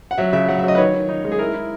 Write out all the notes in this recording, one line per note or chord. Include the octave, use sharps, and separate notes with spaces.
F#5
F#3 E5
C#3 E5
F#3 F#5
E5
F#3 D#5
B4
D#3 C#5
D#3
D#4
G#3
G#4
E4 A#4
E4